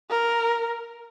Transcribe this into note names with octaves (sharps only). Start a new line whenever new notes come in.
A#4